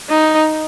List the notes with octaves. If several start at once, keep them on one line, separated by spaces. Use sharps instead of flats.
D#4